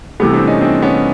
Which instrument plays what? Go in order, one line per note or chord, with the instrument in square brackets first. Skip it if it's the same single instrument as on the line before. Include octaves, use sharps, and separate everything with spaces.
[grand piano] C2 C3 E3 A3 B3
C4 D4
C#4 D#4
C4 D4
B3 C#4